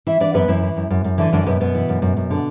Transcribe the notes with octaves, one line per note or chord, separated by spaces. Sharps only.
E3 E4 E5
E3 D4 D5
F#2 B3 B4
F#2 E3 E4
E3
F#2
F#2
F#2
D3 E3 D4
F#2 D3 D4
F#2 B2 B3
F#2 B2 B3
E3
F#2
F#2
F#2
D3